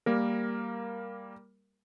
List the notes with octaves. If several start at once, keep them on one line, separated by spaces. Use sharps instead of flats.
G3 A#3 A#4